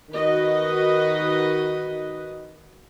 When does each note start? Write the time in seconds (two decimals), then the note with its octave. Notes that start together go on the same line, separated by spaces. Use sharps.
0.13 D#3 F#4 B4 D#5